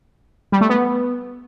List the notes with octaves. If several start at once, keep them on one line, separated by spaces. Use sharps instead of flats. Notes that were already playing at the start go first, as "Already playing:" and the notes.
G3
A3
B3